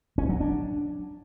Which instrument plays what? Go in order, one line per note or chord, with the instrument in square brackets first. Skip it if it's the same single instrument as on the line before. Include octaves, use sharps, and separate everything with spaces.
[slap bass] C#4
F#3
D4